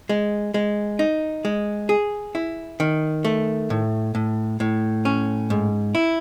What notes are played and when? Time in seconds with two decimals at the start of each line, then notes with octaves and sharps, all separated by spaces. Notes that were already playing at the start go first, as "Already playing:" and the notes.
0.09 G#3
0.54 G#3
0.99 D#4
1.45 G#3
1.89 G#4
2.35 E4
2.80 D#3
3.25 A3
3.70 A2
4.15 A2
4.60 A2
5.05 C#4
5.50 G#2
5.95 E4